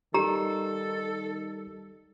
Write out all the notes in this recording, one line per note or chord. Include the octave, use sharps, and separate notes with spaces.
D#3 G3 D#4 G4 A4 A#5